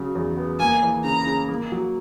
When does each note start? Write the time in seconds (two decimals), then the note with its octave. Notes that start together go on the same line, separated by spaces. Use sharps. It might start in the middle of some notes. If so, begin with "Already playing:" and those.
Already playing: C#3 F#3
0.15 E2
0.37 B3
0.59 A#3 G#5
0.83 E3
1.04 C#3 A#5
1.26 C#3
1.49 A#3
1.72 F#3